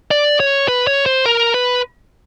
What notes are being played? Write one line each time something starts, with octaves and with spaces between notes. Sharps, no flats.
D5
C#5
B4
C#5
C5
A#4
B4